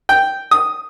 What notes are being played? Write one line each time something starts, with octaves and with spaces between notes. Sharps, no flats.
G5
D#6